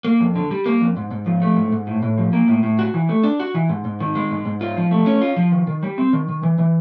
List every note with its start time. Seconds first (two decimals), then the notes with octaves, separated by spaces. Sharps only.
0.05 A#3
0.20 F2
0.35 D3
0.51 G3
0.66 A#3
0.81 F2
0.97 G#2
1.11 G#2
1.26 F3
1.42 A3
1.57 G#2
1.72 G#2
1.87 A2
2.03 A2
2.18 F3
2.33 A#3
2.48 A2
2.63 A2
2.79 F#4
2.94 E3
3.09 A3
3.24 D4
3.40 F#4
3.54 E3
3.69 G#2
3.85 G#2
4.00 D#3
4.15 G#3
4.31 G#2
4.45 G#2
4.61 F4
4.77 F3
4.91 A3
5.06 C#4
5.21 F4
5.36 F3
5.52 D#3
5.67 D#3
5.83 G3
5.98 C4
6.13 D#3
6.29 D#3
6.43 E3
6.58 E3